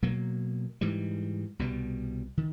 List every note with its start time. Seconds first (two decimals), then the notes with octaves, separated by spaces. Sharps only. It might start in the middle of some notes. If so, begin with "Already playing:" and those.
0.03 B2 F#3 A#3
0.81 G#2 E3 G3
1.59 C2 B2 G3
2.37 D#3